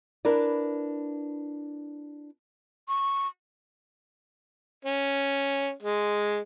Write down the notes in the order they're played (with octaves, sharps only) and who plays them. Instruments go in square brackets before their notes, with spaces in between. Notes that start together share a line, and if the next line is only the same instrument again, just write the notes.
[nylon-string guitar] D4 E4 A#4 B4 D5
[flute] C#6
[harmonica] C#4
G#3